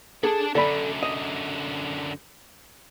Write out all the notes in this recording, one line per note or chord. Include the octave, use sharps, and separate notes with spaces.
D4 G#4 A4 A5
F#2 D3 A4 D5 B5
D#5